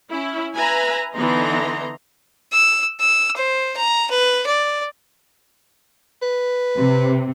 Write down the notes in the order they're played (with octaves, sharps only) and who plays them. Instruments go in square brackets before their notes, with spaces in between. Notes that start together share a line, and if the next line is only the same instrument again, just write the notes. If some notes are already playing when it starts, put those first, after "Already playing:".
[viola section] C#4 E4
B4 E5 G#5 A#5
D3 E3 B3 D#4 A#5 C6
[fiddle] E6
E6
C5
A#5
B4
D5
[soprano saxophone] B4
[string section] C3